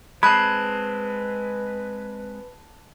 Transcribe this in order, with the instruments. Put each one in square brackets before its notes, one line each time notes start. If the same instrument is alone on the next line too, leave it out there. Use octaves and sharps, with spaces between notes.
[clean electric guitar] G#3 C4 [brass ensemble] B4 [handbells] A5 F#6 G#6 [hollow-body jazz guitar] B5